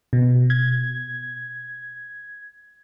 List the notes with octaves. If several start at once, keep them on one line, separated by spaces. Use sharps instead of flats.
B2
G#6